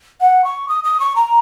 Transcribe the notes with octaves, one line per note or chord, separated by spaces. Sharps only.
F#5
C#6
D#6
D#6
C#6
A#5